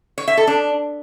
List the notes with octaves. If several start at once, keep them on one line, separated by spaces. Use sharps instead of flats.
C#5
E5
A4
D4